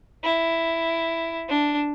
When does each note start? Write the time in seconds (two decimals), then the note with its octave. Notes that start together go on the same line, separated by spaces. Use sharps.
0.24 E4
1.49 D4